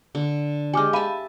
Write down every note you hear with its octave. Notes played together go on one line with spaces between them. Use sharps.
D3
G#3 G4 G#5 D6 F6
E5 F5 A5 B5 D#7